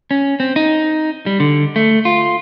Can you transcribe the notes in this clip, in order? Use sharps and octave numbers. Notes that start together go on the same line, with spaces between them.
C#4
C4
D#4
G3
D3
A3
F4